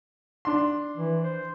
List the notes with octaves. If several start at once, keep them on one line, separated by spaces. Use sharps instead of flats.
D4 C6
E3
C5